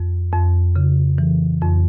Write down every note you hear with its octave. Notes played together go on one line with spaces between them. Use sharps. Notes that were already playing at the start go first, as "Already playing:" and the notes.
Already playing: F2
F2
C#3
E3
F2